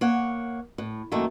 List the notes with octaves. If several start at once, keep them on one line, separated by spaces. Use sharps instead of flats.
A#3 C#5 F#5
A2
F#2 D#3 A3 A#3